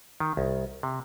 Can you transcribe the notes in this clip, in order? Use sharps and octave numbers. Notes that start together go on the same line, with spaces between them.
D#3
C2
C3